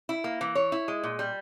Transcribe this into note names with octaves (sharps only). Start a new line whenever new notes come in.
E4
A#3
E3
C#5
E4
G#3
A#2
G3